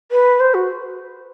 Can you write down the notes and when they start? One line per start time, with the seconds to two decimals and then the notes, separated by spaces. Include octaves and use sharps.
0.12 B4
0.40 C5
0.54 F#4